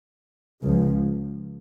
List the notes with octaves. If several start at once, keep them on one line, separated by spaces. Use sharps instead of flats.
C#2 C#3 F3